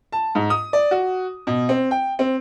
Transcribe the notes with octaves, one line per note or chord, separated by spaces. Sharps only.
A5
G#2
D#6
D5
F#4
B2
C4
G5
C4